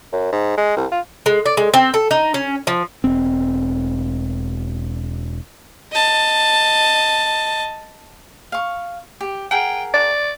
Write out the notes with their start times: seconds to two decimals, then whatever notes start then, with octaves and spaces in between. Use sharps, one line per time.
0.13 F#2
0.33 G#2
0.57 G#3
0.77 C2
0.92 F4
1.26 G#3
1.46 D5
1.57 G#3
1.74 C4
1.94 A4
2.11 D#4
2.34 C#4
2.67 F3
3.04 E1 C4
5.92 D#5 A5
8.52 F5 C#6
9.21 G4
9.51 G#4 A#4 F#5 G5
9.94 D5